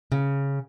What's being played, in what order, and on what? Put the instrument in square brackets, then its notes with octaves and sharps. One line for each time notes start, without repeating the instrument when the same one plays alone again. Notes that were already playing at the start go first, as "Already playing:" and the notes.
[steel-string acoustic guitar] C#3